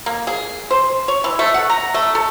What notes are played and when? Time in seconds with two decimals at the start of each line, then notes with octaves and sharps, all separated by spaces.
0.06 A#3
0.27 G#4
0.71 C5
1.08 C#5
1.24 E3
1.39 A3
1.54 F#5
1.70 A#5
1.94 A3
2.15 A4